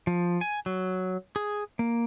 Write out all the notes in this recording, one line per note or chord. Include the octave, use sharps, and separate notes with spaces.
F3
G#5
F#3
G#4
A#3